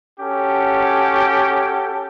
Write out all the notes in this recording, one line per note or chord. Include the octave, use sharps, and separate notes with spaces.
C#4 F#4 G4 A4